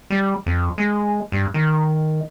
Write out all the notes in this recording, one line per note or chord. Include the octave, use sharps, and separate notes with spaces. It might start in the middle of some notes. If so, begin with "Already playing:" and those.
G3
F2
G#3
G2
D#3